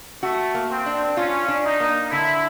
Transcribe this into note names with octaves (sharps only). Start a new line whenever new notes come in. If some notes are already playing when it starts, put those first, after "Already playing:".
A3 F#4
A#3
C4
D4
C#4 F4
D4
D#4
A#3
D3 E4